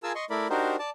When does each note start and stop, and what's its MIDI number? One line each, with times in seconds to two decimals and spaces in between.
0.03 0.12 65
0.03 0.12 68
0.03 0.12 70
0.03 0.12 80
0.03 0.12 81
0.03 0.12 88
0.15 0.25 75
0.15 0.25 84
0.15 0.25 85
0.30 0.47 57
0.30 0.47 64
0.30 0.47 70
0.30 0.47 74
0.30 0.47 83
0.50 0.76 62
0.50 0.76 63
0.50 0.76 66
0.50 0.76 67
0.50 0.76 70
0.50 0.76 72
0.79 0.90 74
0.79 0.90 81